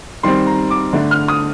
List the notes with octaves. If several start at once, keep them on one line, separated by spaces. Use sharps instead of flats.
D#3 G3 C4 C6
A#5
D6
D3 A3 D4
F6
D#6